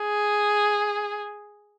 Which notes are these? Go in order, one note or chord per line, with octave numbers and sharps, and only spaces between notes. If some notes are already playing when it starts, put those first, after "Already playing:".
Already playing: G#4